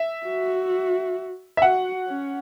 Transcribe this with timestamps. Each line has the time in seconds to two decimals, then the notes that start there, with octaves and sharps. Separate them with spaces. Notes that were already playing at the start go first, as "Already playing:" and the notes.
Already playing: E5
0.26 F#4
1.57 E5
1.62 F#4 F#5
2.07 C#4